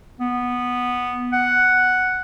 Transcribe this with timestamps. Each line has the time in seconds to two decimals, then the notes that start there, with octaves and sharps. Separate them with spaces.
0.21 B3
1.33 F#5